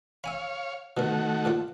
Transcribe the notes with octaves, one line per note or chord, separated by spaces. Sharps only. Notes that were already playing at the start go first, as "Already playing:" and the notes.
C#5 E5 F5 G#5 B5
B2 D3 D#3 A3 F#4 A#4
A#2 A#3 F4